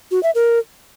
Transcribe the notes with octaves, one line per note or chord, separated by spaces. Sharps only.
F#4
E5
A#4